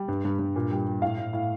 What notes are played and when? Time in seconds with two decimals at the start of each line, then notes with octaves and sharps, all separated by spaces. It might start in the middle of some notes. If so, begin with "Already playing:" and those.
Already playing: G3
0.08 G2
0.25 G2
0.39 G2
0.56 A#2
0.71 G3
0.87 G3
1.02 A2 F5
1.18 A2
1.33 A2